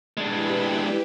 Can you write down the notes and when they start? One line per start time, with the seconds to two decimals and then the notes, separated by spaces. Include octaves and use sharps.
0.17 G#3 D4 E4 G4 B4